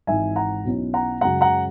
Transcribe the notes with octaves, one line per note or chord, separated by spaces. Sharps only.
G#1 G#2 E3 E5 G#5
F#5 A#5
B1 B2 F#3 C#4 E4
F#5 A#5
F#2 C#3 G#3 F#5 A#5
F#5 A#5